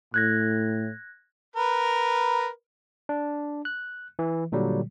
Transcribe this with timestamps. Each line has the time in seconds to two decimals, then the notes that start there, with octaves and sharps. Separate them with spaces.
0.14 A2 F#6 G#6 A#6
1.56 A#4 B4
3.09 D4
3.65 F#6
4.19 E3
4.52 A#2 D3 F#3 G3